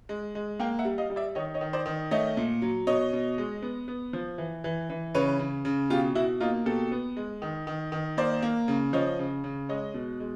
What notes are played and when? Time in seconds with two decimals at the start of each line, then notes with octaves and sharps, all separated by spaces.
0.09 G#3
0.35 G#3
0.59 A#3 F5 G5
0.79 E5 F#5
0.85 G3
0.98 D#5 F5
1.10 G3
1.16 D5 E5
1.35 D#3 C#5 D#5
1.54 C#5 D#5
1.61 D#3
1.73 C5 D5
1.86 D#3
2.11 A3 C#5 D#5
2.37 A#2
2.62 F#3
2.87 B2 C#5 D#5
3.13 B2
3.38 G#3
3.62 B3
3.88 B3
4.13 F3
4.38 E3
4.64 E3
4.90 E3
5.15 C#3 B4 C#5
5.39 C#3
5.65 C#3
5.90 B2 F4 G4
6.15 B2 E4 F#4
6.40 A#3 D#4 F4
6.66 B2 G4 A4
6.92 B3
7.17 G#3
7.42 D#3
7.67 D#3
7.92 D#3
8.17 A#3 C5 D5
8.43 A#3
8.68 C#3
8.93 F3 C#5 D#5
9.19 C#3
9.44 C#3
9.69 G#3 C#5 D#5
9.94 B2
10.20 G#3